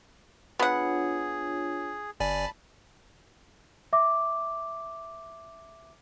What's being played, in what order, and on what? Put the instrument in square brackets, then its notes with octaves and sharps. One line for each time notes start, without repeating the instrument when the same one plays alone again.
[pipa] B3 F#5 [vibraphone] D4 F4 C#5 [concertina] G#4
[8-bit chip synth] G1 D5 G#5 [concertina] A5 B5
[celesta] E5 D6